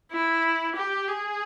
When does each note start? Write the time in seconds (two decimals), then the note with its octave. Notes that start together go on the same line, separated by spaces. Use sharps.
0.11 E4
0.75 G4
1.07 G#4